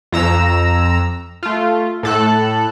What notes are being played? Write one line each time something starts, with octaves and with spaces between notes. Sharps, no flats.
F2 A#5 E6
A3 F4
A2 A4 F#6